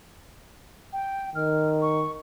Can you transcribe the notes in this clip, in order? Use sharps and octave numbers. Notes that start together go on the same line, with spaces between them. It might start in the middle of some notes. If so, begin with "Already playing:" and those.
G5
D#3 F6
C#6